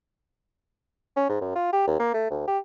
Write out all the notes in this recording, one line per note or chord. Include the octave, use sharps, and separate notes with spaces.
C#4
G#2
F#2
F4
G4
D#2
A#3
A3
D2
G4